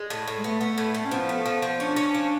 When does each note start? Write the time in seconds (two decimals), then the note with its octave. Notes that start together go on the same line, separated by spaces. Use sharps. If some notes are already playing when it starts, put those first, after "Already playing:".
Already playing: G#3
0.10 A2
0.28 A2
0.37 G#3
0.44 A3 B3
0.61 B3
0.78 A2
0.94 A2
1.05 C#4
1.11 F3 B3
1.29 A3
1.46 F3
1.62 F3
1.79 C#4 D4
1.96 C#4
2.15 F3